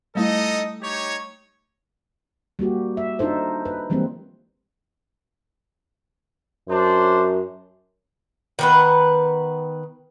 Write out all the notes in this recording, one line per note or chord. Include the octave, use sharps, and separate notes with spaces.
G3 A3 D#4 E4 A4 D#5
D#4 G4 C#5
G3 A#3 F#4 G4
E5
D4 D#4 F4 A4 C5
B4
E3 G3 G#3 A#3 C4
F#2 D4 C5
D#3 B3 B4